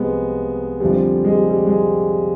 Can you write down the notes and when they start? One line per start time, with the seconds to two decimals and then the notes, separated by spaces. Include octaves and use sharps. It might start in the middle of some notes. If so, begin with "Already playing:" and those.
Already playing: C2 C3 F3 G#3 B3
0.80 F1 F2 D3 F3 G3
1.24 G#3
1.33 G3
1.50 G3
1.67 G#3